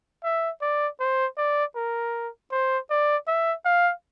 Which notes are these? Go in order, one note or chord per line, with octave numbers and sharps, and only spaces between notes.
E5
D5
C5
D5
A#4
C5
D5
E5
F5